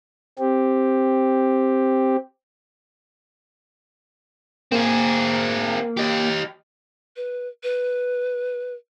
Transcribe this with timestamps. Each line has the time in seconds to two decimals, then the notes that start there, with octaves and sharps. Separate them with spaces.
0.39 C4 G4
4.72 A#3 C4 G#4
5.97 G4 D#5
7.16 B4
7.63 B4